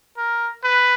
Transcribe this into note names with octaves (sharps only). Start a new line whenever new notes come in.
A#4
B4